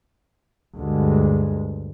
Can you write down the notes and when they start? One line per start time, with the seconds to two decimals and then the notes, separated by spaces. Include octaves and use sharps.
0.76 D2 G2 G#3